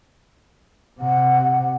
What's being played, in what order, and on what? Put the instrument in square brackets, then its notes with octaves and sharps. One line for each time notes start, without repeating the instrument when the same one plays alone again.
[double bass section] C3 [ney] F#5